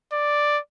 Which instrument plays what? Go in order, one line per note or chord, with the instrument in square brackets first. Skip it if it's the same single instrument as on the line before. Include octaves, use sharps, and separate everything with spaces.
[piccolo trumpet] D5